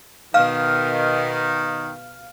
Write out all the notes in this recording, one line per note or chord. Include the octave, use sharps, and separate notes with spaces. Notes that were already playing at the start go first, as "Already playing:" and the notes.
B2 D#3 B3 F5 F6